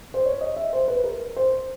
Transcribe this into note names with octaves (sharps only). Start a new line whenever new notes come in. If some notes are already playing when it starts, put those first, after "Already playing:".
C5
C#5
D#5
E5
C5
B4
A#4
C5